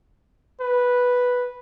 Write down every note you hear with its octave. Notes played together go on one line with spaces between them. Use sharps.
B4